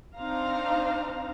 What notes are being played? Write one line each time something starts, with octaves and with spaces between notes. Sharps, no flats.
C4 D4 D#4 C5 F5 A#5